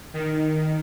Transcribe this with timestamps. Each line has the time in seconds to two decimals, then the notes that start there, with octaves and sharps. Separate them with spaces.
0.13 D#3